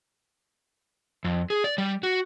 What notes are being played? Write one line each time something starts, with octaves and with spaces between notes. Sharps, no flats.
F2
G#4
D5
G3
F#4